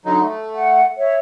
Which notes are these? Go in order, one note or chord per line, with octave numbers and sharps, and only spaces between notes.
D3 F#3 D#4
A3
F#5
C#5 E5